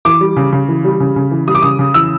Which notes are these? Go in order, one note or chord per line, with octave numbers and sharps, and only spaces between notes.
E3 D6
G3
C#3
C#3
E3
G3
C#3
C#3
E3
G3 D#6
D6
C#3 D#6
C#3
E3 E6